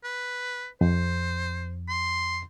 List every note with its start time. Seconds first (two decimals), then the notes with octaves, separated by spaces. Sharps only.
0.04 B4
0.81 F2 C5
1.89 C6